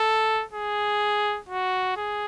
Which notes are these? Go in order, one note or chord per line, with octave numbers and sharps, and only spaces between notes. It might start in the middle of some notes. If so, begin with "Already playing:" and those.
Already playing: A4
G#4
F#4
G#4